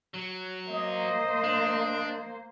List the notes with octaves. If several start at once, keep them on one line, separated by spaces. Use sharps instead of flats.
F#3
A#3 C5 D#5
D4